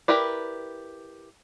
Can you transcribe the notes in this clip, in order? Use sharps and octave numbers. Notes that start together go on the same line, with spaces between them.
E4 G4 A#4 B4 D5